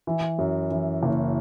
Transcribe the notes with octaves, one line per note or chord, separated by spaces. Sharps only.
E3
F#2
E3
F#1